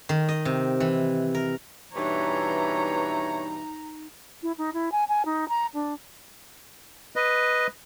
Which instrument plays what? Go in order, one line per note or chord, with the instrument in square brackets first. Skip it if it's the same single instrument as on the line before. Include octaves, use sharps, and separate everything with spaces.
[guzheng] D#3
D#5
C3
E3
A#4
[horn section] G2 B2 E3 [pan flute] D#4 [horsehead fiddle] C#5 [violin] A#5
[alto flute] E4
D#4
E4
G#5
G#5
D#4
A#5
D4
[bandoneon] B4 D#5